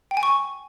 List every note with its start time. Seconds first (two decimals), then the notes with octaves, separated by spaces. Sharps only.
0.11 G5
0.17 G#5
0.23 C#6